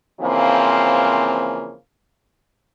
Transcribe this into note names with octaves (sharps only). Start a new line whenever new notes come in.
C#3 E3 F3 A#3 C4